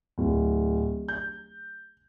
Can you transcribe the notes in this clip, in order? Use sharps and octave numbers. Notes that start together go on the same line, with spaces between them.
D1
G6